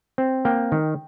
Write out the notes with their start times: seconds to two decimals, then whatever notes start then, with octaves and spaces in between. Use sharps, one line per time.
0.18 C4
0.45 A#3 G5
0.72 D#3